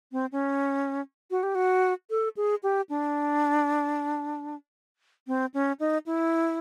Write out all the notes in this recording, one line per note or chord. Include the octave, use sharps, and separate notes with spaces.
C4
C#4
F#4
G4
F#4
A4
G#4
G4
D4
C4
C#4
D#4
E4